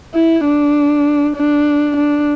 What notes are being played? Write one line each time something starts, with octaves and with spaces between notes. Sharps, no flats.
E4
D4
D4
D4